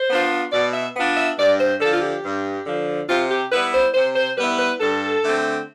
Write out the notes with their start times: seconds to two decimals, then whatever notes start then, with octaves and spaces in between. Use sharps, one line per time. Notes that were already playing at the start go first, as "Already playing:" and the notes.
Already playing: C5
0.09 B3 D4 F4
0.52 B2 D5
0.73 E5
0.95 B3 D4 F4
1.17 E5
1.38 G2 D5
1.60 C5
1.80 D3 F3 A4
1.93 F4
2.02 G4
2.24 G2
2.66 D3 F3
3.09 C3 F4
3.31 G4
3.52 G3 B3 E4 B4
3.73 C5
3.94 C3 C5
4.16 C5
4.37 G3 B3 E4 B4
4.59 B4
4.80 G2 A4
5.23 D3 A3 C4